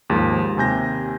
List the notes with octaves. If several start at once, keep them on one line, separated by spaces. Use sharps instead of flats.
D#2 G#2 F3 G#3
D#2 C3 G#5 G6 A#6